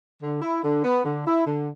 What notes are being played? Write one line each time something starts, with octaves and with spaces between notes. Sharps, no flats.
D3
E4
D3
B3
D3
E4
D3